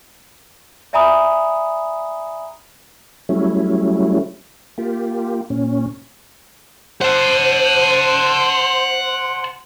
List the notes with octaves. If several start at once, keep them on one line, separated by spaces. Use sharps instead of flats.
D5 E5 G#5 A#5 B5 D#6
F#3 G3 A3 C#4 E4
A#3 F4 G4
A#2 C#4
C5 F#5 A5